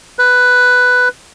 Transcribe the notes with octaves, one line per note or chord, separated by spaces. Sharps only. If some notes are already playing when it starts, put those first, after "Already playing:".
B4